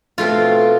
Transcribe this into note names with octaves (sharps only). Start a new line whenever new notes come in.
B2 A3 C4 F4